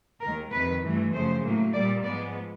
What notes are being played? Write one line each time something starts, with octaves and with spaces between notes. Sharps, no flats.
D#2 D#3 G#3 A#4
F2 C3 D#3 B4
G2 E3 A3
F#2 C#3 F3 A3 C5
A2 F#3 A#3
A#2 G3 A#3 D5
G#2 F3 G#3 B3 D5